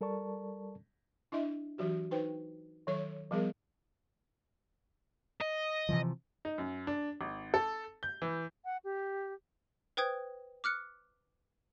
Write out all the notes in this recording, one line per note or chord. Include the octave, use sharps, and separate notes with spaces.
G3 A4 A#4 D5 A5 C#6
D4 E4 D#5 E5
E3 F#3 F#4 G4
D#4 B4 C5 G5
D#3 F#3 A4 C#5
F3 G3 B3 G#4 A#4
D#5
C3 E3 F3
D#4
F#2
D4
G#1
A4
G6
E3
F#5
G4
B4 C5 G5 D#6 G#6
D6 F6 F#6 C#7